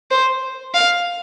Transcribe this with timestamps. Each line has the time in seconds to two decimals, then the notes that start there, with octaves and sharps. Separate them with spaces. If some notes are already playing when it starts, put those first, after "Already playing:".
0.11 C5
0.74 F5